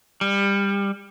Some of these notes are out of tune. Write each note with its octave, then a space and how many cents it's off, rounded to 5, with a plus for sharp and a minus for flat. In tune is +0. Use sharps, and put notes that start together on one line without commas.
G3 +25